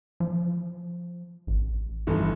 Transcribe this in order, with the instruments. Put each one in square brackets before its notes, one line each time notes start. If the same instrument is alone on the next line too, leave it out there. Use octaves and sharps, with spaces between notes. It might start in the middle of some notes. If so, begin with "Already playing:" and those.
[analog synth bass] F3
A1
[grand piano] G1 E3 A4